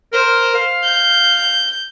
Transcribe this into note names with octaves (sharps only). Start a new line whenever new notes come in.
A#4 C5
F5
G6